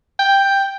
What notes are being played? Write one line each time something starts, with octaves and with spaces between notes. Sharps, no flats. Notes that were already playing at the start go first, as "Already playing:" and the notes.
G5